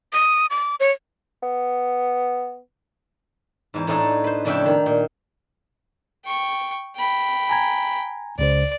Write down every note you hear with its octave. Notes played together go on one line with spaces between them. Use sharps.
D#6
D6
C#5
B3
E2 G#2
A2 A3 D4 D#4 G#4 A4
B4 C5
F2 A2 C#3 D4 E5 G5
D#3
A#2
G5 C#6
G5 B5
G#5 A#5 G#6
C#2 C#3 C5 D5